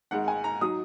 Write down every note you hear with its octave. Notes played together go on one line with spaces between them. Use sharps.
G#1 G#2 G#3 F#5
G#5
A#5
F#3 D#4 D#6